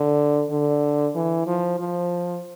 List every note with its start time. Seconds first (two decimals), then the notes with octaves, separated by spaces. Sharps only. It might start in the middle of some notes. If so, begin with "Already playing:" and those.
Already playing: D3
0.51 D3
1.15 E3
1.47 F3
1.80 F3